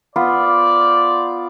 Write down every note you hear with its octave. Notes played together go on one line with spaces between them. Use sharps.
B3 F4 C5 D5 D6